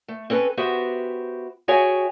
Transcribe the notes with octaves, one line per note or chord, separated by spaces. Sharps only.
A3
C4 C#4 A4 B4
B3 F#4 G4 C5 E5
F#4 G#4 C#5 E5 G5 G#5